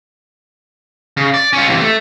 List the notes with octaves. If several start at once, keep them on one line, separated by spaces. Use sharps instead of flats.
C#3
D5
C#4 F4
C3 E3
A3